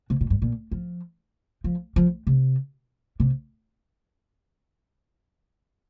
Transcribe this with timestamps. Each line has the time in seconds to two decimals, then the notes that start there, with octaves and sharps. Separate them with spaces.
0.10 C3
0.21 A#2
0.30 G2
0.42 A#2
0.71 F3
1.64 F3
1.96 F3
2.27 C3
3.20 C3